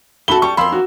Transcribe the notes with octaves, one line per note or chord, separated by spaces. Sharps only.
A3 F#4 A4 B5 G7
G3 C#6
F2 A#4 B5 C6 E6
F#4